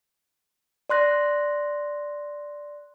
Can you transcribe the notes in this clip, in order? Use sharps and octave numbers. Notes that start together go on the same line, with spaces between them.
D5 C6 F#6 A#6